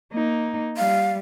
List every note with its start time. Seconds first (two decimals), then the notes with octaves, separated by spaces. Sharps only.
0.13 A#3 D#4
0.77 G3 F5